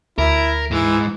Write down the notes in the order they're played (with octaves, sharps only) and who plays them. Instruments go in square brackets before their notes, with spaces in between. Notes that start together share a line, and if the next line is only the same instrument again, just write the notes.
[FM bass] D2 [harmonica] E4 [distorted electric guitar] A#4
[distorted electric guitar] G#2 G#3 [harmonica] E3